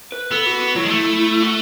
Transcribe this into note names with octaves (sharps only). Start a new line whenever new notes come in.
B4
B3 A4
F#4
F#4
F#3 E4
G#3
A3
F#4